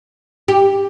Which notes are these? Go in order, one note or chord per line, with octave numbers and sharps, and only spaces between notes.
G4